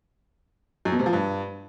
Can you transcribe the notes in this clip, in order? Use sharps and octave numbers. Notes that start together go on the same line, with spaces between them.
F#2
B2
C3
F3
G2